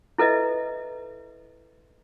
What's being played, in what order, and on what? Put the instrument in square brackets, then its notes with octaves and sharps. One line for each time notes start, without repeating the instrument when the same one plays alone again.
[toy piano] E4 A4 B4 D#5 E5